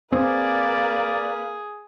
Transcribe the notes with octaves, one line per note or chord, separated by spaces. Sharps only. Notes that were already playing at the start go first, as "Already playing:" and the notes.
A#3 C4 G#4 B4 D5